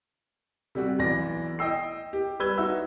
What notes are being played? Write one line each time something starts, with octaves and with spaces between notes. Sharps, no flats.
C3 G3 F#4
B1 E3 D5 A#6
D#5 G5 E6 C7
G4
G3 B4 E6 G#6 G7
D#4 F#4 E5 E6